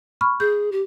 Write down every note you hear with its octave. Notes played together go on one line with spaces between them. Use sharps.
B5 C#6 F6
G#4 G6
G4